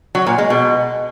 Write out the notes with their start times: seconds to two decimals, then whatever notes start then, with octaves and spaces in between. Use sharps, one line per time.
0.15 F#3
0.27 A#2
0.38 G#3
0.50 B2